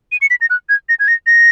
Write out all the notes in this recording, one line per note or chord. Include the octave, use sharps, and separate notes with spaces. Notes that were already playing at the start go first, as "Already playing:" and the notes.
D#7
C#7
B6
A#6
F#6
G#6
A#6
G#6
A#6
A#6